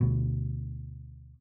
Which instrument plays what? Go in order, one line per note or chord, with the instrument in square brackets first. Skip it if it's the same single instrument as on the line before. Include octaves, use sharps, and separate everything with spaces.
[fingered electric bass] D2 B2